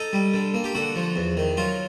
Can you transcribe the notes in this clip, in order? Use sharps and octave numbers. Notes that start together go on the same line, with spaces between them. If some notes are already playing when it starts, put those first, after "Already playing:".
Already playing: D#4 A4
G3
D3
A#3
G4
D3 F#4
F3
E2
D#3
F#3 F4